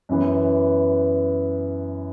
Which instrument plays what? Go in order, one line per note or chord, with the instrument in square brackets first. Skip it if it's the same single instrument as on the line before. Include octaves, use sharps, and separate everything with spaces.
[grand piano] F#2 E3 B3